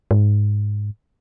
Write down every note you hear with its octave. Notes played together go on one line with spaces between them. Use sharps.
G#2